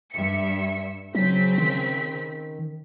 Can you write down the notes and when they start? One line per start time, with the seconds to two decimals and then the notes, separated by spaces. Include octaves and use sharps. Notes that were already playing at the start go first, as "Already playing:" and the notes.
0.12 G2 E5 C#7
1.15 C#3 F#3 C4 B6
1.58 D#3